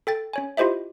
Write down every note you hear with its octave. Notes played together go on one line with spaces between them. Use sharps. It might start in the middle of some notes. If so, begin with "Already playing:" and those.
A4 G5 A6
C#4 C#5 G#5
E4 F4 G4 C5 D#5 E5